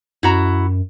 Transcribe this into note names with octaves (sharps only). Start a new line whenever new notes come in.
F#2 E4 F#4 A#5